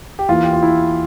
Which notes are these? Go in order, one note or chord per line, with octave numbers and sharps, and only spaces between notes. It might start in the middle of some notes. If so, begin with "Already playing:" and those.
G4
E2 E3 A#3 F4
G4
F4
E4